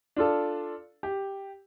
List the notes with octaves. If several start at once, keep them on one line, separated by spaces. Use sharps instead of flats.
D4 F4 A4
G4